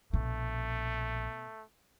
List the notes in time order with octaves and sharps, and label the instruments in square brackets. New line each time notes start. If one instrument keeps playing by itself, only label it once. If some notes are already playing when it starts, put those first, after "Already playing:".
[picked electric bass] A#1 [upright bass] B2 [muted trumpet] A3